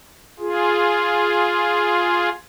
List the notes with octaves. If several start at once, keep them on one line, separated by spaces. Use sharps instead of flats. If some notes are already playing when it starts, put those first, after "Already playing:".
F4 G#4